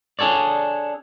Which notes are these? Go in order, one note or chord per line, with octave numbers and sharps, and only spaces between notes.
D4 G#4 A4 C#5 D5